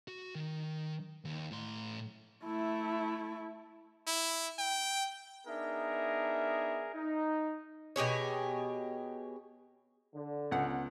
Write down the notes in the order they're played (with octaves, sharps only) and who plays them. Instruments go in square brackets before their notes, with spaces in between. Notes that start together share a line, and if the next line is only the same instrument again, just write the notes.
[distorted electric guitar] F#4
D#3
D#2
A2 C6
[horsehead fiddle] A3 E4
[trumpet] E4
G5
[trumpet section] B3 D4 D#4 G#4 A#4 E5
D#4
[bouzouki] B2 G4 G#4 C#5
[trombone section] D3
[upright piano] C#2 [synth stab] B3 F#5